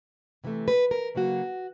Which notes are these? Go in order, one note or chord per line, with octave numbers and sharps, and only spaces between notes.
C3 E3 A3
B4
A#4
C#3 F#3 A#3 F#4